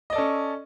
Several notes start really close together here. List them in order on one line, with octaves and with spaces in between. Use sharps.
D#5 D5 A4 C#4